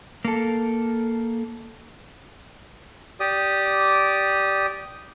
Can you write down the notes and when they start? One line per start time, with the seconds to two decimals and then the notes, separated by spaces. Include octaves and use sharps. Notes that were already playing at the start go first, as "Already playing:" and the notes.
0.25 A#3 A4
3.20 G4 D5 D#6